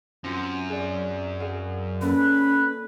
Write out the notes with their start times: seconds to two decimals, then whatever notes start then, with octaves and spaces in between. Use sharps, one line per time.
0.24 F#2 C4 F4 F#4
0.69 G#4 D5
1.40 G#4 D5 F5
2.01 A#3 C#4 A4 B4